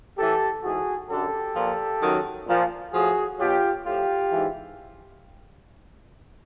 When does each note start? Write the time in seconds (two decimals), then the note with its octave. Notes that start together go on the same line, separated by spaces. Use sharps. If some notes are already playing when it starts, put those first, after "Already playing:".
0.18 A2 E3 G4 A4
0.64 G#2 E3 F#4 G#4
1.09 F#2 D3 F#3 G4 A4
1.55 A#2 F3
2.02 F#2 D#3 F#3
2.48 A#2 F3
2.93 A2 F3 F#4 G#4
3.39 B2 F#3 F4 G4
3.85 A2 F3 F4 G4
4.31 G#2 E3